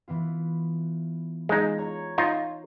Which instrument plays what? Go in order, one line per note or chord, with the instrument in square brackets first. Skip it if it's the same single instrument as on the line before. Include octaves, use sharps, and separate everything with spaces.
[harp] E3 B3 F4
[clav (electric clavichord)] G#3 D#4 [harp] F4
[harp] C#5 A#5
[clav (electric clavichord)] D#4 F4